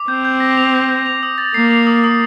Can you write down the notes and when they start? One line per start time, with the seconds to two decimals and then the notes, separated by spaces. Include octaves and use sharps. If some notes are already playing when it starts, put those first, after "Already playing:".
Already playing: D6
0.08 C4 G6
0.25 G6
0.40 A#6
0.57 F7
0.74 G6
0.89 G6
1.06 F7
1.23 D#6
1.38 A6
1.54 A#3 C7
1.71 F7
1.87 D#6
2.04 D#6